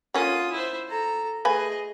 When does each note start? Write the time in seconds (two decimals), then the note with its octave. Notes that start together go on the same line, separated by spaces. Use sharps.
0.14 D3 A#3 C#4 F4 D#6
0.52 E4 C5
0.89 A4 A#5
1.45 A3 G#4 B4 D#5 G#5